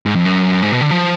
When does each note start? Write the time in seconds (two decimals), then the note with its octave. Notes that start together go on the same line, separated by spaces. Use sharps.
0.06 G#2
0.16 F2
0.25 F#2
0.62 G#2
0.72 B2
0.81 D3
0.91 F3